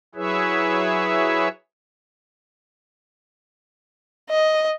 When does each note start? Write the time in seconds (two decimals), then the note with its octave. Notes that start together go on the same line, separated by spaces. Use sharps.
0.15 F#3 E4 G#4 B4 C#5 E5
4.30 D#5